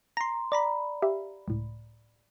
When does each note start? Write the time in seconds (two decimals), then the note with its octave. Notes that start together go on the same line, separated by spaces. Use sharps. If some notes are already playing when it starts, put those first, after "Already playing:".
0.17 A#5 C6
0.52 D5 A#5 B5
1.02 G4 E5 F5
1.48 C#2 A2